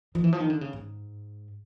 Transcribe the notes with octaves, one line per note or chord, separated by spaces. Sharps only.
F3
E3
F3
D#3
D3
C#3
G#2